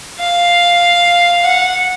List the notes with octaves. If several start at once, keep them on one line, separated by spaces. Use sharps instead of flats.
F5
F#5